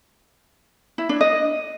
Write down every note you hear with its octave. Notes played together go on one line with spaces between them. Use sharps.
E4
D4
D#5